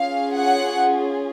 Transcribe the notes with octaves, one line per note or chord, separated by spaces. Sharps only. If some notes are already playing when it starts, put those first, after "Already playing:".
Already playing: C#4 F4 G#4 F5
F#5